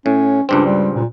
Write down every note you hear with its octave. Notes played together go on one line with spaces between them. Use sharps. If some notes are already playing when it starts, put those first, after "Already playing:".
A2 C#4
C#2 G2 C4 D4
G3
A#2